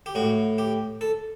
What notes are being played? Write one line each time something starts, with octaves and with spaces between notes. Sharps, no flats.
G4
A2 F#4
G4
A4